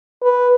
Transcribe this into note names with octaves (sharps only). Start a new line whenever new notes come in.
B4